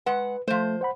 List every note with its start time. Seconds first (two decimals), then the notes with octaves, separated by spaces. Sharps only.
0.06 G#3 B4 F#5
0.48 F3 A3 C5
0.81 C5 F#5 B5